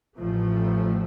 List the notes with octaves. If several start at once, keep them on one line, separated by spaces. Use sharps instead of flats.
A1 A2 F3 A3